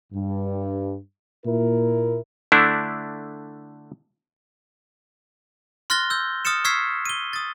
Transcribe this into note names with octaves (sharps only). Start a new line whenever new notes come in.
G2
A#2 E4 A#4
D3 A3 D4 E4
C6 F6 F#6 A6 A#6 G7
E6 G6
D#6 F6 A6 C#7 E7
C#6 E6 F6 G#6 B6 C7
D#7 G7
D#6 A6